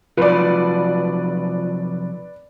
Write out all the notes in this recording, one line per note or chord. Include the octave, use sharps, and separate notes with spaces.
C3 F3 F#3 F4 B4 D5